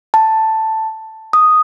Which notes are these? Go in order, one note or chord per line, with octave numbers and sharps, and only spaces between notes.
A5
D#6